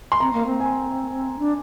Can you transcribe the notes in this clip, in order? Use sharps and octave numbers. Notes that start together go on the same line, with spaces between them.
C6
C4 A#5
A#3
C4
G#5
D4